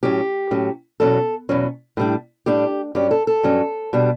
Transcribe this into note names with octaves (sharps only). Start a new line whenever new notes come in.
A2 F#3 C#4 G4
A2 F#3 C#4
E2 B2 F#3 C#4 A4
E2 B2 F#3 C#4
A2 G3 D4
A2 G3 D4 G4
G2 F#3 C#4 G4
A4
A4
G2 F#3 C#4
B2 G3 D4